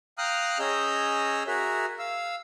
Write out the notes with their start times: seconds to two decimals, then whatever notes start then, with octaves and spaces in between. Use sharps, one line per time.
0.18 F5 G5 A#5 D#6 F6 F#6
0.59 C#4 G#4 D#5 A#5 E6 G6
1.47 F#4 G#4 A#4 E5
1.99 F5 E6